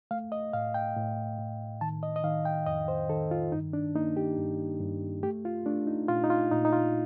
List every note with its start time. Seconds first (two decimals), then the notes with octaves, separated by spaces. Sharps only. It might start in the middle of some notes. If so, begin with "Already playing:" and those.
0.11 A3 F5
0.32 D#5
0.53 A2 F5
0.74 G5
0.96 A2
1.39 A2
1.81 D#3 A5
2.03 D#5
2.16 D#5
2.24 D#3 F5
2.45 G5
2.66 F2 D#5
2.88 C5
3.09 D#3 A4
3.31 F4
3.52 G2 D#4
3.73 D4
3.95 A#3 D#4
4.17 G4
4.38 G2
4.80 G2
5.23 A3 G4
5.45 F4
5.66 A3 D4
5.87 D#4
6.08 A#2 F4
6.24 D#4
6.30 F4
6.51 A#2 D#4
6.65 D#4
6.72 F4